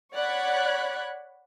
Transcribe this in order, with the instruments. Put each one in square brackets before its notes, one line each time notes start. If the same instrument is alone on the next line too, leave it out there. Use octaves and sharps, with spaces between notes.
[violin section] C#5 D5 F#5 B5 F#6 G#6